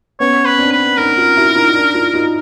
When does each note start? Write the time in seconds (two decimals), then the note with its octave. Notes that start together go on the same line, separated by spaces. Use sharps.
0.20 B3 C#4 C#5
0.45 B4
0.58 C4 D4
0.72 B4
0.97 C#4 D#4 A#4
1.17 D#4 F4
1.37 E4 F#4
1.55 D#4 F4
1.75 D4 E4
1.94 D#4 F4
2.14 D#4 F4